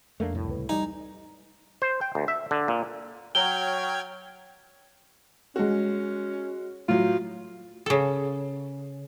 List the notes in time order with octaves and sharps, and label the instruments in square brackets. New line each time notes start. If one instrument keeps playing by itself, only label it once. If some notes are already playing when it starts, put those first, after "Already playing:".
[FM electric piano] F2 [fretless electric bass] A3 A#3 D4
[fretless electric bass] C2 A2
[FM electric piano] C#2 B4
[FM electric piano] G3 D5 G#5 [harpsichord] D#4
[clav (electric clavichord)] C5
G5
D2
E5
D3
A#2
[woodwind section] F#3 [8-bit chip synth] G5 F6 G#6 [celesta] G7
[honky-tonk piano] G#3 F#4 [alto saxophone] C#4
[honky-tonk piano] A2 F#3 [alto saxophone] F4
[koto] C#3 A4